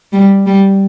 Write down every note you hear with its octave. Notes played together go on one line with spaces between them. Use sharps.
G3
G3